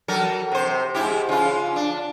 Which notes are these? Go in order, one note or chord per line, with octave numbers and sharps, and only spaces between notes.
F#3 A4 A#4
C3 C5
G#2 E4 G4
C#3 F4
D4